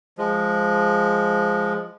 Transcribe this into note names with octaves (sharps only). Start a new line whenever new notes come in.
F3 G#3